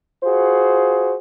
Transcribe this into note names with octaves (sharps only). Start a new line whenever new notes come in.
F4 F#4 G#4 C5